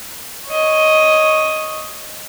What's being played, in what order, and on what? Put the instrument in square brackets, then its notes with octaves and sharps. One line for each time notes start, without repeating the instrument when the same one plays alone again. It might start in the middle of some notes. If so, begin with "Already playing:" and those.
[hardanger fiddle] C#5 D#5